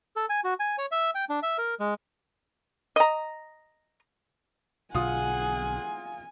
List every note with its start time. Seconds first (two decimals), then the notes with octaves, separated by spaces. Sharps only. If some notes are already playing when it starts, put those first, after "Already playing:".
0.16 A4
0.29 G#5
0.44 F#4
0.60 G#5
0.78 C#5
0.91 E5
1.15 G5
1.29 D4
1.43 E5
1.58 A#4
1.80 G#3
2.96 D#5 A#5
4.94 B1 B2 D3 F4 G#4 F#5 G#5 D#6